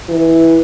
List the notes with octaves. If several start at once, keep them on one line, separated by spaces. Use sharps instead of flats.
E3